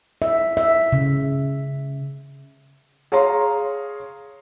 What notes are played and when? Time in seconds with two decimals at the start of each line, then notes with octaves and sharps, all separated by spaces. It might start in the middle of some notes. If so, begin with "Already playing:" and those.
0.22 E5
0.57 E5
0.92 C#3
3.12 G#4 C#5 F5 A#5 C6